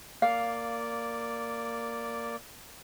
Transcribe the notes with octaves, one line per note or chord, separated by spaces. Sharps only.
A#3 D5 F5